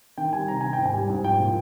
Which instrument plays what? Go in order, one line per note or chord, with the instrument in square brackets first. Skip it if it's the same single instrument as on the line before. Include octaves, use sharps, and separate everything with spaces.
[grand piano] D#3 G5
G3 G#5
C3 A#5
D#3 G#5
G5
G#2
G#5
G3
G#2
F3 G5
A#2